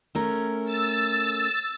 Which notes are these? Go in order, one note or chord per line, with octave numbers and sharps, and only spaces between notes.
A3 C#4 A#4
E6 A6